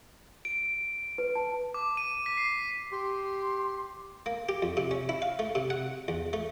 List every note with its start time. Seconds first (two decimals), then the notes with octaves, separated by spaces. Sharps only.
0.45 D7
1.18 B4
1.35 A5
1.74 D6
1.97 D#7
2.26 B6
2.37 C7
2.92 G4 C6
4.26 A#3
4.49 G4
4.62 F2
4.77 C3
4.91 C#4
5.09 E4
5.22 F5
5.39 A3
5.55 C3
5.70 F#5
6.08 E2
6.33 A3